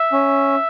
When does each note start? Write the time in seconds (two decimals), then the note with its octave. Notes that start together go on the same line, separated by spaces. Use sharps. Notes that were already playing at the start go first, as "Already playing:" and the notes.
Already playing: E5
0.12 C#4